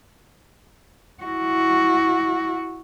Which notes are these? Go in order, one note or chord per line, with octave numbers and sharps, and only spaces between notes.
E4 F#4